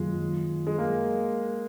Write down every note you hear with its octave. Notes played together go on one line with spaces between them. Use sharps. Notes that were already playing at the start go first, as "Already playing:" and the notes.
Already playing: F#2 D#3 F#3 G#3 A#3 F4
G#3
A#3